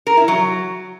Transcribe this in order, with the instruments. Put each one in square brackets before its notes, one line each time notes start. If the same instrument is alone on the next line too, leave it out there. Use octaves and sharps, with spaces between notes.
[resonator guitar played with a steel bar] A#4
E4
F#3